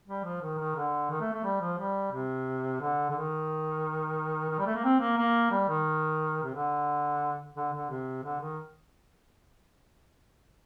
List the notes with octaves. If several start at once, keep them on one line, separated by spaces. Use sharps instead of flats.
G3
F3
D#3
D#3
D3
D#3
A3
A3
G3
F3
G3
C3
D3
D3
D#3
D#3
G3
A3
A#3
C4
A#3
A#3
G3
D#3
C3
D3
D3
D3
C3
D3
D#3